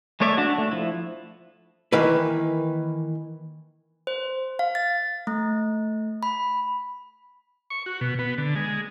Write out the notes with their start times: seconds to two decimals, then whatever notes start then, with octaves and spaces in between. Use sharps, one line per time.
0.20 G#3 A3 C#5 D5 E5
0.38 D4 F#4
0.58 A3
0.71 F3 E4
1.92 D#3 E3 A#3 B4
4.07 C5
4.59 F5
4.75 A6
5.27 A3
6.23 B5
7.70 C#6
7.86 F#4
8.01 B2
8.19 B3
8.38 D3
8.56 G#3